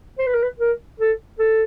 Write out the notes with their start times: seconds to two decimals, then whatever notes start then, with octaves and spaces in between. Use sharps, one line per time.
0.18 C5
0.26 B4
0.34 A#4
0.43 B4
0.59 A#4
1.00 A4
1.39 A4